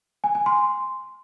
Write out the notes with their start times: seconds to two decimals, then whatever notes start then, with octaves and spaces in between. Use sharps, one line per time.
0.24 G#5
0.35 G#5
0.46 C6